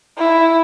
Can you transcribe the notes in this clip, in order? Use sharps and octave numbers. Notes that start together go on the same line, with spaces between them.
E4